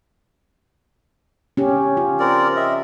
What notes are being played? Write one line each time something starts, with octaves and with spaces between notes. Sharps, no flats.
C#4 G4
F4
C4 A#4 D5
D#5 E5